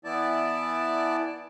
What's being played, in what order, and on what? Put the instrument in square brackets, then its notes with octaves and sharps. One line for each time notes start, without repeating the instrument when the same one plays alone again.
[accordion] E3 B3 E4 D5 A5